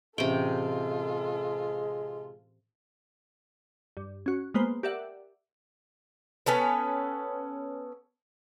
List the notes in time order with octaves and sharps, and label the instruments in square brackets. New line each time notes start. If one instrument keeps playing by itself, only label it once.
[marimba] A2 E3 C#4 [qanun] C3 G5 [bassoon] G#3 [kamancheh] F4 A4
[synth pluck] G2
C#4 F#4
G#3 A#3 B3 B4 C5
G4 A#4 D5 E5 F#5
[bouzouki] B3 C#4 A4 B4